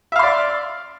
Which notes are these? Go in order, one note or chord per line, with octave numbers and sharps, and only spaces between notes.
D5 E5 F5 C6